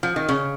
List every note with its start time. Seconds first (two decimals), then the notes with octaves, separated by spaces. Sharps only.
0.03 F3
0.16 D#3
0.29 C#3